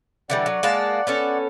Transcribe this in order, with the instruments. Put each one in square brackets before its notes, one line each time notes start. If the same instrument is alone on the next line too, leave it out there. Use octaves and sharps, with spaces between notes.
[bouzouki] D3 E3 G3 [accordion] D5 F#5
[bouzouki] F#3
G#3 A#3 A5
B3 C#4 A4